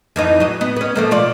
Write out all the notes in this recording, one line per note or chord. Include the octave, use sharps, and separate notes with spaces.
F2 E3 D#4
F#3 D#5
B3
B3 C#4
F3 A3 A#3
B2 F4 D5